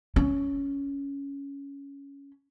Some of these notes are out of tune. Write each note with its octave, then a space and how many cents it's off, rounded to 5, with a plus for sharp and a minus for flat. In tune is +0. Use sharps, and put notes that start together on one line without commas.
C#4 +10